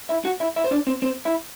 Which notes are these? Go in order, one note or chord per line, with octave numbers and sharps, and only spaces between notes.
E4 E5
F#4 F#5
E4 E5
E4 E5
C5
D4 D5
C4 C5
C4 C5
E4 E5